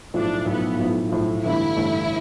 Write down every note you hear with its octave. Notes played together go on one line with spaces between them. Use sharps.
B1 A2 F3 D4
B1 A2 F3 B3
B1 A2 F3
B1 A2 F3
G1 G2 E3 A3 E4
G1 G2 E3 A3